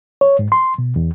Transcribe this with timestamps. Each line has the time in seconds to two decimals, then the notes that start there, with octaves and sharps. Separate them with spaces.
0.21 C#5
0.39 G#2
0.52 C6
0.78 B2
0.96 E2